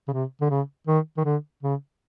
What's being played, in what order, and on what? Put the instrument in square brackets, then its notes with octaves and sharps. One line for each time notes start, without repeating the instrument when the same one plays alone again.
[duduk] C#3
C3
D3
C#3
D#3
D#3
D3
C#3